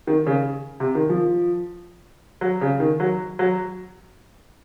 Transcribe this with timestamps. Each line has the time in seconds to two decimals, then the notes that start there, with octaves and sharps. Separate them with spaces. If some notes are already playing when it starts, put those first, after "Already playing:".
0.07 D#3
0.27 C#3
0.80 C3
0.95 D#3
1.09 F3
2.41 F#3
2.61 C#3
2.80 D#3
3.00 F#3
3.39 F#3